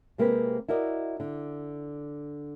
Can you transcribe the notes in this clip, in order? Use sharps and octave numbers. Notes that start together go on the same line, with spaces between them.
C3 G#3 A#3 C4 G4 B4
E4 F#4 A#4 D5 D#5
D3